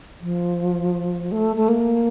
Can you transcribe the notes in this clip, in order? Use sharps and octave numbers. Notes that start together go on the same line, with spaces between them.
F3
A3
A3
A#3